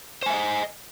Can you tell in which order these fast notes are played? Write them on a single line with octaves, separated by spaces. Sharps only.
C5 G#5 E5 D#5